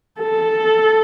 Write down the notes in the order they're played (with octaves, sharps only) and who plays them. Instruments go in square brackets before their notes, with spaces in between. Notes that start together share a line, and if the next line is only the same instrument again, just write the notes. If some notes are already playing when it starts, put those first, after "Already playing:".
[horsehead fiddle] A4